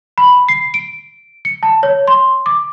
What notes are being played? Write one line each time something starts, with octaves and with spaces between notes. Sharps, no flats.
B5
C7
D7
C#7
A5
C#5
C6
D6